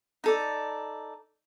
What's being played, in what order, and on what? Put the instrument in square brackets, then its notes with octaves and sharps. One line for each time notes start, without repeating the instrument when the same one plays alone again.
[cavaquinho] D#4 A4 D5